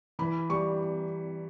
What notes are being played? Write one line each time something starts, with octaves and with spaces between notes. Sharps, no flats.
E3 B5
G3 C#6